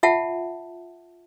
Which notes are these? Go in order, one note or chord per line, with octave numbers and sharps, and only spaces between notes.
F4 E5 F#5 A5